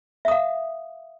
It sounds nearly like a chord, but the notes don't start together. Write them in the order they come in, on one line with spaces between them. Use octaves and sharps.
E5 D#6 F5